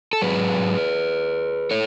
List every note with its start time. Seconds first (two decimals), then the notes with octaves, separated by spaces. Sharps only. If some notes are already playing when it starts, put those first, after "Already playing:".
0.13 A4
0.22 G#2 F#3 G#4 B4
1.71 A4 C#5